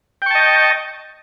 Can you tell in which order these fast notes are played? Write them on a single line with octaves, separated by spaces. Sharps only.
G5 C#6 A5 D#5